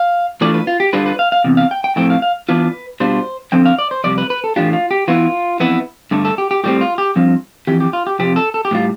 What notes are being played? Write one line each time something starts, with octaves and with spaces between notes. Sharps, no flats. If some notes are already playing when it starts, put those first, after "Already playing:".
Already playing: F5
E3 A3 D4 F4 D5
B4
F4
G4
G2 D3 G3 D4 F4 B4
B4
F5
F5
E2 C3
F5
G5
G5
A2 F3 C4 E4 G5
F5
F5
E3 B3 D4 F4 B4
B2 G3 D4 F4 C5
F2 D3 F3 C4 G5
F5
D5
C5
F2 C3 G3 D5
B4
B4
A4
A2 E3 G3 D4 F4 G4
F4
G4
E3 B3 E4 F4
F2 E3 B3 E4
G2 D3 A3
A4
G4
G4
A2 G3 C4 G4
F4
G4
G2 F3 C4 F4
F2 E3 G4
G4
F4
G4
F2 C3 F3 G4
A4
A4
G4
A2 E3 G3 F4